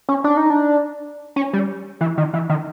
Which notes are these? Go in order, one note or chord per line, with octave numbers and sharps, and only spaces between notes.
C#4
D4
D#4
D4
C#4
G3
E3
D#3
E3
D#3